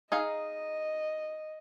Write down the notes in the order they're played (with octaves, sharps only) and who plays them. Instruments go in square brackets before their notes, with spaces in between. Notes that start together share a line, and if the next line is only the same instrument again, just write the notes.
[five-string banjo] D#4 G#4 F5 [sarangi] D#5